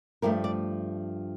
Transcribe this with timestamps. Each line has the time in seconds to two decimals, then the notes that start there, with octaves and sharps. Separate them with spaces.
0.22 G2 F3 A3 A#4
0.44 D5